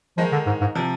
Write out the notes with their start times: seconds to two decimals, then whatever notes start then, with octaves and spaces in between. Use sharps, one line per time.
0.17 D#3 F3 G#3 D#4
0.32 D3
0.46 G#2
0.61 G#2
0.75 C3 F3